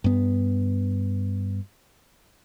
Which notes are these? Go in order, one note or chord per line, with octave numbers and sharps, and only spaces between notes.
G2 B3